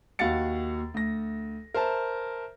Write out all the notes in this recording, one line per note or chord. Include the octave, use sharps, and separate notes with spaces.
D#2 F#4 F5 F#5 A6 C#7
D2 A#6
A#4 C5 E5 A5